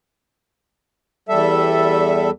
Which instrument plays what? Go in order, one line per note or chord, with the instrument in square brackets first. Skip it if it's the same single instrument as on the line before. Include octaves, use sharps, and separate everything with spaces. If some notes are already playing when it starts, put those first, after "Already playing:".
[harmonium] E2 G3 A4 E5